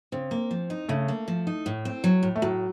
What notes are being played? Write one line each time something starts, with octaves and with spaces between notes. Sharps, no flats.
C#3 C4
A#3
F3
D#4
C#3 A3
A#3
F3
D#4
A2
C4
F#3
A2
A3
A2 F#3